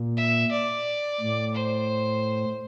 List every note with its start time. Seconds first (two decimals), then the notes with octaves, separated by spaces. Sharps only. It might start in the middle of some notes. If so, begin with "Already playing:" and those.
Already playing: A#2
0.17 E5
0.51 D5
1.20 A2
1.55 C5